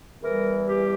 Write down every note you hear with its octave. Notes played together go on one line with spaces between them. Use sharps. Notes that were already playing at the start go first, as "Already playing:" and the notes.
E2 E3 G3 A#4
G4